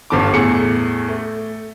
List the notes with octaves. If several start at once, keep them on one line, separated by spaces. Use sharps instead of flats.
G1 G2 D3 A5 D6
E2 A2 G#4 A4 C#7
A3